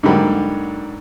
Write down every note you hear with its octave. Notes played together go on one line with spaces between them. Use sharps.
G#2 D3 F#3 G3 A#3